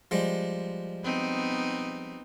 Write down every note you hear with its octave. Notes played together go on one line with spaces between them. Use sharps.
F3 G3 G#3
B3 C4 D#4